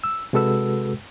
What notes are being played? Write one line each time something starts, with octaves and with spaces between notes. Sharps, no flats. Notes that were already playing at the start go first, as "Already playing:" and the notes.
E6
C3 G#3 F#4 A4 B4 E6